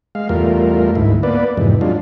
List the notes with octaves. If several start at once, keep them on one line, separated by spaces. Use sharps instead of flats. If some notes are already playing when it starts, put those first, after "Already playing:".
G#3 F5
E2 G3 A3 F4 A#4
D2 G#2 E4
A#3 B3 B4 D5
F2 G#2 C3 E3
F#3 G#3 D4 F4